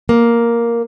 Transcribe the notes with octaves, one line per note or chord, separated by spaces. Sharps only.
A#3